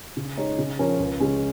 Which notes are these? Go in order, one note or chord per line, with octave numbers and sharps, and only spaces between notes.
C#3
G#3 D#4 C#5
C#3
F3 C#4 A#4 C#5
C#2
C#3 G#3 C#4